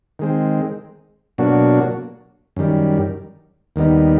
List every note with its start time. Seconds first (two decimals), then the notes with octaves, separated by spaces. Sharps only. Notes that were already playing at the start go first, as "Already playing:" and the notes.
0.19 D#3 G#3 C4
1.38 B2 F#3 A#3 D4 F#4
2.56 F#2 D#3 G3
3.76 D#2 D#3 G3 B3 D#4